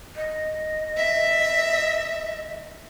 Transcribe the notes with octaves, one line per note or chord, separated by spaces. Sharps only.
D#5
E5